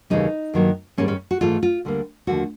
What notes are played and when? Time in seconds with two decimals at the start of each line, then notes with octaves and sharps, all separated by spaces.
0.10 D#2 C#3 E3 G3 D#4
0.54 G2 D#3 F#3 A#3
0.98 G#2 D#3 G3 A#3 C#4
1.08 C#4
1.31 F#4
1.41 G#2 E3 A3 F4
1.63 F4
1.85 D2 D3 G3 A#3
2.27 D#2 D3 F3 A3 F#4